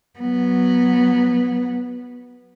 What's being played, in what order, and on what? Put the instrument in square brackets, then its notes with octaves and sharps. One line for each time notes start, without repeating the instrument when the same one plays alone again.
[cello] F#3 B3